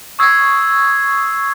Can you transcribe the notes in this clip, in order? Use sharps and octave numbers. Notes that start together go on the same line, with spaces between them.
C#6 D#6 E6 G#6 C7